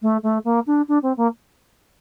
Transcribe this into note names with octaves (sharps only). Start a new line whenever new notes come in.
A3
A3
A#3
D4
D4
C4
A#3